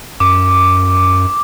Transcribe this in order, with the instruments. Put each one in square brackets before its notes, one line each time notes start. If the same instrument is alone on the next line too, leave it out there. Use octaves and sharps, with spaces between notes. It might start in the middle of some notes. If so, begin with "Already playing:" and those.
[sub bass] F#2 [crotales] D6